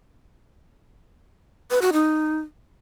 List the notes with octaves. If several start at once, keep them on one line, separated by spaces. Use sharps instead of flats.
B4
F#4
D#4